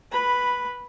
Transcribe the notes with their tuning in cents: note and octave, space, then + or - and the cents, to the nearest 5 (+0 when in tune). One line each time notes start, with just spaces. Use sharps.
B4 -10 B5 +0